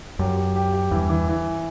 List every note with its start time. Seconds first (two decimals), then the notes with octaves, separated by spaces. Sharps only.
0.19 F#2 G4
0.36 G4
0.56 G4
0.73 G4
0.91 E2 G2 E3
1.09 E3
1.28 E3